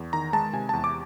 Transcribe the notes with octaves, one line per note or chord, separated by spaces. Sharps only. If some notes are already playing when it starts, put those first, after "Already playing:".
Already playing: E2
D#3 A#5
G#3 A5
C3 G#5
E2 A5
D6